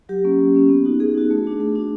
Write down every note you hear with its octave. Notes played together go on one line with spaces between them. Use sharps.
F#3 G4
A#3 C#4
F#3
A#3 C#4
B3
D#4 F#4
B3 G#4
D#4 F#4
A3
D4 F#4
A3
D4 F#4